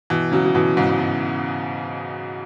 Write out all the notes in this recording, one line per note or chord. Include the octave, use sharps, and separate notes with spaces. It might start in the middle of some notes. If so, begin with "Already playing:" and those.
B2 E3
C#3 F#3
F#3
B2 E3
G#2 C#3
G#2
B2